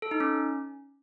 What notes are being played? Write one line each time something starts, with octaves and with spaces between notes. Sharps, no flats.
A4
D#4
C#4